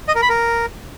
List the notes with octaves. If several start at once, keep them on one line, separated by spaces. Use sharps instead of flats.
D#5
A#4
B5
A#4